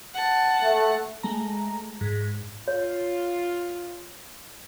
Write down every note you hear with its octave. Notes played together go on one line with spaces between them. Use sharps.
F#5 A5
A3
G#3 A3 A#5
G#2
F4 C#5